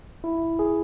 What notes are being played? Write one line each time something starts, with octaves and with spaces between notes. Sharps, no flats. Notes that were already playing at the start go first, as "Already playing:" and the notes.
E4
G#4